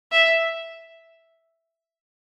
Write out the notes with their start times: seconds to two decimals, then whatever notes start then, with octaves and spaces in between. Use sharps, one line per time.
0.12 E5